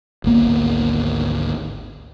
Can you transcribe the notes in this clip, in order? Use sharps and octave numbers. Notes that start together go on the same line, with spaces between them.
G#1 D2 A#3 B3